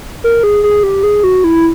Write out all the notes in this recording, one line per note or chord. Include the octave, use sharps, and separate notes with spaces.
A#4
G#4
G#4
G4
G#4
F#4
E4